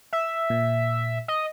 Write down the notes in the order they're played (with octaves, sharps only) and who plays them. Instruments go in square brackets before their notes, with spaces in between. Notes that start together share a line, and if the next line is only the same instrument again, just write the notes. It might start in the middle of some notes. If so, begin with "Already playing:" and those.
[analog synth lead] E5
[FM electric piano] A#2
[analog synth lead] D#5